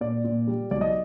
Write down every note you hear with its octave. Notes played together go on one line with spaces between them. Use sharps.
A#2 D5
A#2
G3
B1 D5
D#5